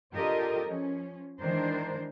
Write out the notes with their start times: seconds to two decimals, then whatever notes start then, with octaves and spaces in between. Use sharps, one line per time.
0.14 D4 F4 G4 A4 A#4 D#5
0.66 F3 C#4
1.41 D#3 E3 G#3 D4 A#4 C5